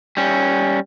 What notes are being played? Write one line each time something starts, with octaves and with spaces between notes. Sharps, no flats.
G3 C#4